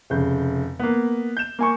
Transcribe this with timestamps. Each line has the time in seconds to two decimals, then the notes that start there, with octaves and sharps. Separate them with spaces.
0.10 F1 C#3 G6
0.80 A#3 B3
1.37 G6 E7
1.59 A#3 G#5 C#6